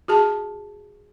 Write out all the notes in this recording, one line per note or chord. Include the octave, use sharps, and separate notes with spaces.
F#4 G#4 A5